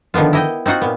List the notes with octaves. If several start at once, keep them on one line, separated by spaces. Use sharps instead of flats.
D3 D#3 F3 B3 F4
E4 D#5 G5
C4 D#4 F4 F#4 F#5
A#2 B3